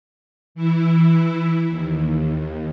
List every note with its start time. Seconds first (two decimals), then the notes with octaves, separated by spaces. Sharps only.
0.55 E3 E4
1.69 D#2